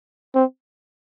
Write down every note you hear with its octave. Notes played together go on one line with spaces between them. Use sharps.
C4